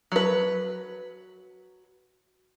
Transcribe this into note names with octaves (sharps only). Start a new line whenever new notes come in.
F#3 B4